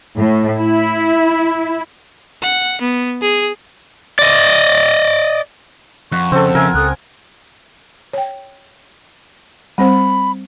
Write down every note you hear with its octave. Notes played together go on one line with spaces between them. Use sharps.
A2
E4
F#5
B3
G#4
D5 D#5
F2 F#5 C#6
C#3 C4 A4
C#3 A#4 E5 G#5 E6
C#2 A4 D#6 F#6
C#5 G5
G3 C4 C5 B5